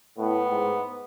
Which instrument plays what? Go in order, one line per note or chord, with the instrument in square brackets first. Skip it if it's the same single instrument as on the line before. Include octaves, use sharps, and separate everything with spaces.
[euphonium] A2 [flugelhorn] B3
[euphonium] G#2